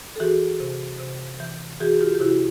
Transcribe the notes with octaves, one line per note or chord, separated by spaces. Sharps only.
A4
E3 F#4 G#4
C3
C3
E3
E3 F#4 G#4
F4 G4
G4
C3 E4 F#4